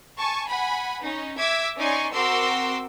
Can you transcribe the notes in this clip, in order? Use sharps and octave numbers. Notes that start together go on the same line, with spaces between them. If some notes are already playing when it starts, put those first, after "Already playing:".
G#5 A5 C#6
F#5 G#5 B5
C#4 D#4
E5 D6 E6 G#6
C#4 D#4 D5 G#5 C6 C#6
C4 F#4 A#4 C6 D6 E6